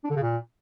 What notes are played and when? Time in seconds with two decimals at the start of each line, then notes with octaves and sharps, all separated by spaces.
0.04 D4
0.10 D3
0.16 C#3
0.22 A#2